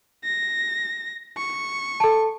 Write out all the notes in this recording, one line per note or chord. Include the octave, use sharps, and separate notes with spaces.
A#6
C#6
A4 A5